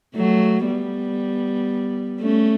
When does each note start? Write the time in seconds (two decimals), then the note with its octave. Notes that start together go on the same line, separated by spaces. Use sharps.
0.15 F#3 A3
0.66 G3 B3
2.21 A3 C#4